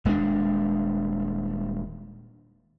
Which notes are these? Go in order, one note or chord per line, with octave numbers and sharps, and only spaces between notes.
D#1 G#3 A3 D4